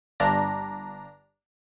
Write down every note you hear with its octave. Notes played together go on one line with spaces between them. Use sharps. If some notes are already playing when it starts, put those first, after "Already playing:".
G1 G2 D4 A#5